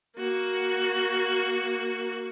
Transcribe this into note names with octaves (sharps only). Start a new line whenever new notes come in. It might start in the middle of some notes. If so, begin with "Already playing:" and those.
A#3 F#4